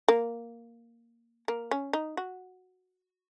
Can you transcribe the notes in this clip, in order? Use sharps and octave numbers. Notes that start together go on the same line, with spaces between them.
A#3
A#3
C#4
D#4
F#4